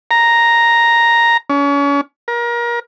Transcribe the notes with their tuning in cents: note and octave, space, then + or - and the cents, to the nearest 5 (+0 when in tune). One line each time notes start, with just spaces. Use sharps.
A#5 +0
C#4 +35
A#4 +30